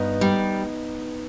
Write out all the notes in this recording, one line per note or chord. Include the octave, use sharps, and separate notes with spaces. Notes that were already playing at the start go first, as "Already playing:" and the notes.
Already playing: G2 B3 D#4
G3